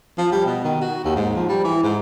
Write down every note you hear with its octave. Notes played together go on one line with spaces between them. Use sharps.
F3
G3
B2
D#3
F#4
D#2
G#2
F3
G3
E3
G#2